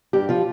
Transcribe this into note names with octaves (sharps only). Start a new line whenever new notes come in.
G2 G4
F3 F4